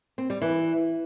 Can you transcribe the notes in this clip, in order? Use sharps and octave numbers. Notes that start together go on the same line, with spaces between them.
C4
G3
E3